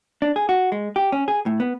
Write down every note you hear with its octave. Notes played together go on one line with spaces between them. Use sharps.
D4
G#4
F#4
G#3
G4
C#4
G#4
A2
B3